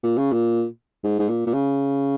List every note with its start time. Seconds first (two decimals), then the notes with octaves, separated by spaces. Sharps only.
0.03 A#2
0.18 C#3
0.32 A#2
1.04 G#2
1.19 G#2
1.28 A#2
1.46 A#2
1.54 C#3